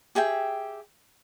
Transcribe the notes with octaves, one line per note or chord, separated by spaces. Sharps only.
G4 G#4 E5 G5